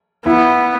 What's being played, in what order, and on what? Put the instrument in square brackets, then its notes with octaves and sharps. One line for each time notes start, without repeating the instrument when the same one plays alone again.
[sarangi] B3 [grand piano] E4